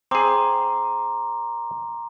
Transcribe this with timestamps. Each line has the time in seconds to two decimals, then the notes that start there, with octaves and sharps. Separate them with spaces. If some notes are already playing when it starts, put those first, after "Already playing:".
0.11 C4 G#4 A#5 C6 D6